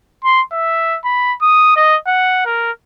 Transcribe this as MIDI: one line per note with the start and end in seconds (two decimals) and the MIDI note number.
0.24 0.42 84
0.53 0.98 76
1.05 1.34 83
1.42 1.72 87
1.76 1.96 75
2.07 2.42 78
2.46 2.71 70